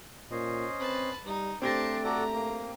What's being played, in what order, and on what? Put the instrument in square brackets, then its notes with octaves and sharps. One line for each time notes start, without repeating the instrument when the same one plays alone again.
[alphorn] A#2 [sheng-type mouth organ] C#4 C5 D#5
[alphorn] C4 [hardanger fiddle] B4 A5
[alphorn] G3 [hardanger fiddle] D#4
[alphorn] A3 [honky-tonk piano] C4 G4 A#6 [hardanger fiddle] D4 A5 [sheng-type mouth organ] C5
[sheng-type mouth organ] F#4 A4 D5 [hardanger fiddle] A#5
[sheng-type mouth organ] A#3